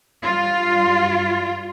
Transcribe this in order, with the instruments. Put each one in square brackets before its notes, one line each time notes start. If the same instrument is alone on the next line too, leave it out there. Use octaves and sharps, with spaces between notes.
[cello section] G2 G3 F4